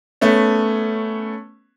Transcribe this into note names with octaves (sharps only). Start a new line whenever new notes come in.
A3 B3 C#4